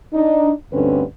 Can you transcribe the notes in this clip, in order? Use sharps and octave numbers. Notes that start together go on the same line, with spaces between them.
D4 D#4
D2 G2 D3 C4 C#4 B4